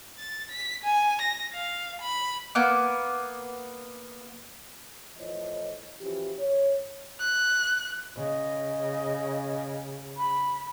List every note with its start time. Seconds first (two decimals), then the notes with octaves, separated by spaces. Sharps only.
0.18 A6
0.51 B6
0.84 G#5
1.21 A#6
1.53 F5
2.01 B5
2.55 A#3 B3 D6
5.17 A2 E3 F3 C5 C#5 D#5
6.01 E3 F3 C#4 F#4 G4
6.39 C#5
7.21 F#6
8.16 C#3 D#5
10.17 B5